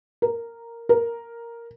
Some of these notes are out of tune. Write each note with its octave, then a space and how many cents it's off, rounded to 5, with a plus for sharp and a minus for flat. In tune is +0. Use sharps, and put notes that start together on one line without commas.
A#4 -5
A#4 +0